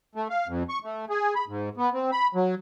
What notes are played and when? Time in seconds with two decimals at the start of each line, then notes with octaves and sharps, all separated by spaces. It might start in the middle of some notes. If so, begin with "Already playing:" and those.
0.15 A3
0.30 F5
0.47 F2
0.69 C#6
0.84 A3
1.10 G#4
1.35 B5
1.48 G#2
1.77 B3
1.94 C4
2.12 B5
2.35 F#3